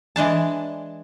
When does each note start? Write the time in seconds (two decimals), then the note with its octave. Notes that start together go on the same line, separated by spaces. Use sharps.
0.16 E3 G#3 D4 A5